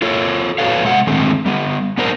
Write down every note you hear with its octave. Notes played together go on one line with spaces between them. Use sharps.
F4 A4 C#5
F#4 A4 B4 C#5 F5
C3 G#3 E5 F#5
D3 D#3 G#3 A3 C4
G3 B3
B3 D4 A#4 C5